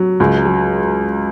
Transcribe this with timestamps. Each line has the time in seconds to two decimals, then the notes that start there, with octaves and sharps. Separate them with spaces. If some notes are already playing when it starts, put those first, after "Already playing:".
Already playing: F#3
0.20 C#2
0.45 F#3